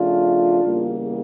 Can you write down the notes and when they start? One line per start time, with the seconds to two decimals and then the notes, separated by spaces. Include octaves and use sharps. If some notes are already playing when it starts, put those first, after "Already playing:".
Already playing: C#3 F3 A3 D4 F4
0.62 E2 C#3 G3 A#3